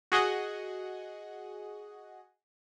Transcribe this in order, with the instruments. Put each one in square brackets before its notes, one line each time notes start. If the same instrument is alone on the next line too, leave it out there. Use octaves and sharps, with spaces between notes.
[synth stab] F#4 G#4 D#5 F#5